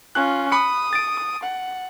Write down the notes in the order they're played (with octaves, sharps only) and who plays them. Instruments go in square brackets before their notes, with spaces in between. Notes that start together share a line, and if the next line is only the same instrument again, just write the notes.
[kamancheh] C#4 F4 [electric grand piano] F#6
[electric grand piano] B5 C#7 [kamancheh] D#6
[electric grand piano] A6 D7
[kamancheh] F#5